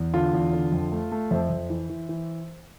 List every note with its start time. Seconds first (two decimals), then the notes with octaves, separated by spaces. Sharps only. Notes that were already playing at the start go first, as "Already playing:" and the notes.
Already playing: E2
0.14 D3 F4
0.33 E2
0.53 D3
0.72 F2
0.92 A3
1.12 A3
1.31 F2 C5 E5
1.50 F2
1.70 E3
1.89 E3
2.09 E3